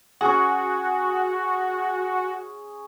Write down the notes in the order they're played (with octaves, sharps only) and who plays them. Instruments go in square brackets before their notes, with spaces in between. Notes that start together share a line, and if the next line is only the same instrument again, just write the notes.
[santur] C#4 G#4 [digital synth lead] F#4